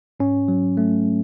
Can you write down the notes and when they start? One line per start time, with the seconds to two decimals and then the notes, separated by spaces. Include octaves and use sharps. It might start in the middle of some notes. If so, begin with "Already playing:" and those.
0.20 G#2 C#4
0.48 F#3
0.77 A3